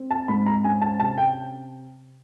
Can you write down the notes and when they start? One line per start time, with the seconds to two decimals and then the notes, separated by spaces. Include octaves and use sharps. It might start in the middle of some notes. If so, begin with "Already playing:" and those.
Already playing: C4
0.11 A5
0.28 G#2 B5
0.46 A#5
0.64 C#4 G#5
0.81 A5
1.00 C3 A5
1.18 G5